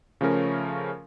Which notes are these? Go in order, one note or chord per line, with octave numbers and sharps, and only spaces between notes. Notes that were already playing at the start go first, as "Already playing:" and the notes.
C#3 F3 A3 C#4 A#4